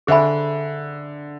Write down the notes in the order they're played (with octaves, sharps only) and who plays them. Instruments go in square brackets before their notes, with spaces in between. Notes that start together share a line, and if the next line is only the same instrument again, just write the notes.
[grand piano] D3 [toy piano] G#4 C5 E5 G#5 B5